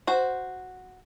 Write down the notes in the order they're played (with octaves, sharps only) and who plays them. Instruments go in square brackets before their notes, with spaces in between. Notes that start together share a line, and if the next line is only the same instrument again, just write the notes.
[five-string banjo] F#4 C5